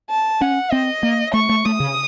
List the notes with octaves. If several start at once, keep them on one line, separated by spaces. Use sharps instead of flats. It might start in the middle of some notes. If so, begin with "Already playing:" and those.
A5
C#4 F#5
C4 D#5
A#3
A3 C#6
A3
A3 D#6
C#3